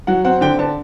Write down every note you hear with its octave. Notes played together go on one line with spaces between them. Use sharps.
F#3 F#5
C4 F#5
D3 G5
D3 A5